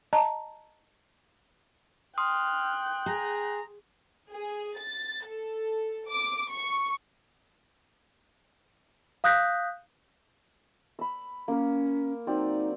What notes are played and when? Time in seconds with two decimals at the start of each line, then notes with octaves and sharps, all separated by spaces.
0.13 D#5 A5 A#5
2.18 G5 C6 D#6 F6 F#6
3.06 G#4 A#5
4.31 G#4
4.77 A6
5.26 A4
6.09 D6
6.49 C#6
9.24 F5 D#6 F#6 G6 A#6 B6
10.99 B5 E6
11.48 A#3 C#4 A#4
12.27 F#3 C4 D#4 D5